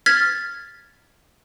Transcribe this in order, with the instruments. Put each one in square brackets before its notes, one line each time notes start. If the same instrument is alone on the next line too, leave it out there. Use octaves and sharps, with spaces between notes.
[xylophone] F6 G#6 A6 B6